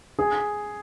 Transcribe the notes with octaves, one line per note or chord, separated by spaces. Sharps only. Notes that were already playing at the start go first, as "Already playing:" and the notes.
G#4